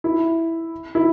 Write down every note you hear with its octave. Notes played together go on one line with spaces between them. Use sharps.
E4
E4